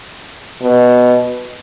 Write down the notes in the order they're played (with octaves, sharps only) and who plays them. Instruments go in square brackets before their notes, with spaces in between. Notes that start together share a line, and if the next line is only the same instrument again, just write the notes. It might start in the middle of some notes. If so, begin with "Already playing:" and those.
[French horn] B2